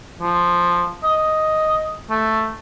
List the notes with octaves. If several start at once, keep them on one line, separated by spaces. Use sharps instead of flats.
F3
D#5
A3